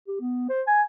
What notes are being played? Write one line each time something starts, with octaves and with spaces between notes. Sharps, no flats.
G4
B3
C5
G#5